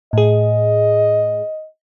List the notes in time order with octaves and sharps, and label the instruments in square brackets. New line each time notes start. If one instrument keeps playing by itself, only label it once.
[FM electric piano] A2 G#4 [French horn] D#5